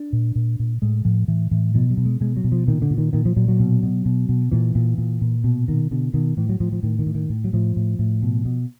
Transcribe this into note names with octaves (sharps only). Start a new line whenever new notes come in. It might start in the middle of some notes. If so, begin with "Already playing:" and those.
Already playing: D4
A#2
A#2
A#2
A2 G#3
A2 F3
A2 E3
A2 E3
B2 F3
F#3
B2
G#3
B2 G#3
F#3
B2
F3
A#2 D#3
D3
A#2
D#3
A#2 D#3
F3
A#2 F#3
F#3
B2
B2
B2
B2
A#2 E3
A#2
A#2
A#2
B2
B2 D#3
B2 D3
B2 D#3
A2 E3
F#3
A2 F3
F3
A2 D#3
D#3
A2
D#3
A2
F#3
A2 F3
A2
A2
B2
B2